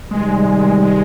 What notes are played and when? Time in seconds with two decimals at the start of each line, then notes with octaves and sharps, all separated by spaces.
0.11 C3 D#3 G3 G#3
0.82 G#3